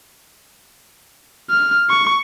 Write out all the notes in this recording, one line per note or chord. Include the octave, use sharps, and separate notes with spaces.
F6
C#6